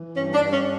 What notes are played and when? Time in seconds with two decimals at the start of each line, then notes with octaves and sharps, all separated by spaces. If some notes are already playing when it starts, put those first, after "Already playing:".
Already playing: E3
0.16 G2 C#4
0.34 D4
0.41 G2
0.53 C#4